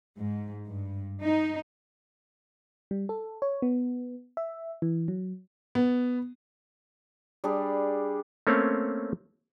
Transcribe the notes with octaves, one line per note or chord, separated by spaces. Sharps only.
G#2
G2
D#4
G3
A4
C#5
B3
E5
E3
F#3
B3
G3 D4 G#4
A3 A#3 C4 C#4 C#5